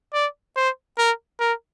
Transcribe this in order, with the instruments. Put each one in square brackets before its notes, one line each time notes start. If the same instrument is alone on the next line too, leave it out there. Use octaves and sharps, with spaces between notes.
[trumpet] D5
C5
A#4
A#4